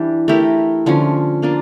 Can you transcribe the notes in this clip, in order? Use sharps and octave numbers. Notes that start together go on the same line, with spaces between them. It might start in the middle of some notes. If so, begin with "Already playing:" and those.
Already playing: E3 G3 D4 G4
A3 E4 G4 A#4
D3 F3 C#4
A#3 D4 F4 A#4